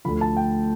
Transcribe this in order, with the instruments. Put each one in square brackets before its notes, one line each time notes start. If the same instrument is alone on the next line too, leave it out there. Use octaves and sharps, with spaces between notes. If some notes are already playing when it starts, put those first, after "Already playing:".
[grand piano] D2 D3 F3 B5
A5
G5